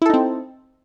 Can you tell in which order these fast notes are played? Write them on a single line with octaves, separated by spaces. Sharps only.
E4 A4 D#4 C4